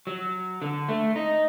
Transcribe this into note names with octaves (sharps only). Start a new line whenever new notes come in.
F#3
D3
A3
D#4